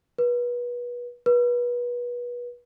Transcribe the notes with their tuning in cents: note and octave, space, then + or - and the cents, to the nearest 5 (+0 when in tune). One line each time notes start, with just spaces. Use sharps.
B4 -30
B4 -30